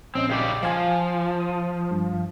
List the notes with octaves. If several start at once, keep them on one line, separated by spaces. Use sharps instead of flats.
A#1 C4 C#4 D#5
C#3 G4 D5
F3 F5 G#5
D#6
G2